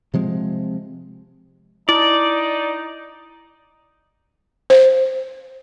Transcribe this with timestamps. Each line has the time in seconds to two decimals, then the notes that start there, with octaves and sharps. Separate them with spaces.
0.14 C3 F3 G#3 C4
1.89 D#4 E4 D5
4.70 C5